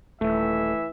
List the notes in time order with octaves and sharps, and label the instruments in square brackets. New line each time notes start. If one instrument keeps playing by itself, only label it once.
[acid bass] D#1 [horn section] E3 E5 [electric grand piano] A3